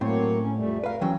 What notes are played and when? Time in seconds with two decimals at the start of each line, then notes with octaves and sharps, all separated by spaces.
0.01 A2 F#3 A#3 C4 C#5
0.41 C#4
0.57 F2 G3 A3
0.84 A#4 B4 F5
1.01 E3 F#3 C#4 G5